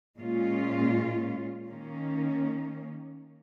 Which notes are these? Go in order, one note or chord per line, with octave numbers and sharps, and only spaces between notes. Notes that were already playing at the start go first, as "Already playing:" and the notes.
A#2 G#3 C#4 F4
D#3 A#3 C#4